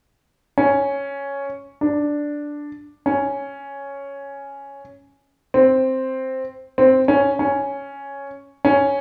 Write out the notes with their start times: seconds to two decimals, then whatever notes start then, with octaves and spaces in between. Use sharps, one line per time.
0.58 C#4
1.81 D4
3.06 C#4
5.54 C4
6.78 C4
7.08 C#4
7.39 C#4
8.65 C#4